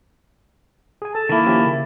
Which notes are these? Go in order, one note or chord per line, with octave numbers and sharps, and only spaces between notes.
G#4 G#5
A4 A5
D#3 A#3 E4
F3 C#4 G4
C#3